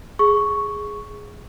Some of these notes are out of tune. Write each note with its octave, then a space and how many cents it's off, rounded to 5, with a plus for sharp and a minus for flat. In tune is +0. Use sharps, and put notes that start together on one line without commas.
G#4 +0 C#6 +0